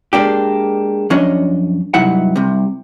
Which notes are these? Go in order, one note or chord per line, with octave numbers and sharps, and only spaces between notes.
G#3 A#3 D4 G4
F#2 F3 C#4 D4 C#5 D#5
G2 C3 F#3 D#4 E4 F#5
C2 C3